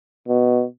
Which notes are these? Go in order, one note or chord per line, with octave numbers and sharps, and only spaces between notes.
B2